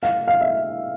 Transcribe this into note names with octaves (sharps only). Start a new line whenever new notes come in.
F5
F5
E5